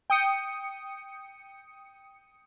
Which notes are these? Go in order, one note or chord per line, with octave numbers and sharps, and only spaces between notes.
G5 D#6 C#7